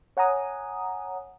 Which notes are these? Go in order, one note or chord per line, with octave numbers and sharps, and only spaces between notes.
C#5 F#5 G#5 A#5 D#6